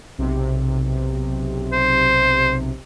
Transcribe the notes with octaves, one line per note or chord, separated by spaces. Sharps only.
B1 C3
C5